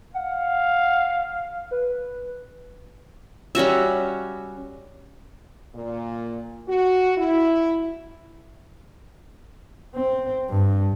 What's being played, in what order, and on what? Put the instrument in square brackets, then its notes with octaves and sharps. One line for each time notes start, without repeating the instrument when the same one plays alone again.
[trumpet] F5 [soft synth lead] F#5
[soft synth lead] B4
[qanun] G3 C#4 F#4 E5
[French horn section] A#2
F#4
E4
[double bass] C4
G2